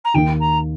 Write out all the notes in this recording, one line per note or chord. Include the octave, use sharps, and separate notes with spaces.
A#5
D#2 D#3 A#3 D#4 G5
A#5